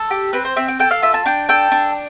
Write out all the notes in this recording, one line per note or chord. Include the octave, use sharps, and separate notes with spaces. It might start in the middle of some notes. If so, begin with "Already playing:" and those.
Already playing: A4
G4
C4 B4
C5
C4 E5
G5
A4 G5
F5
F4 E5
A5
D4 G5
A4 G5
D4